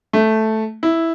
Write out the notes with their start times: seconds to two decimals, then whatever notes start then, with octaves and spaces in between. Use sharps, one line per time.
0.13 A3
0.83 E4